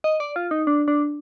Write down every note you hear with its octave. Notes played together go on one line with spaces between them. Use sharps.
D#5
D5
F4
D#4
D4
D4